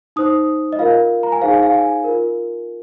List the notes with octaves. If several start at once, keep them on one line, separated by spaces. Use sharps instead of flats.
D#4 C5 D#6
D#5
F4 A#4 F5
A#5
G#5
D#4 G#4 C5 F5
G#5
F5
G#5
F4 A#4